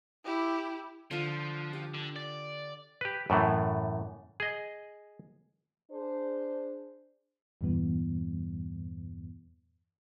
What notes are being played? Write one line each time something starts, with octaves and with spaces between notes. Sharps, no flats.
E4 G4
D3 F3 F4
G4
D3
D5
G4 B4
F#2 A2 E3 A3
G#4 D#5
D4 G#4 C5
E2 G2 A#2 E3 G3 B3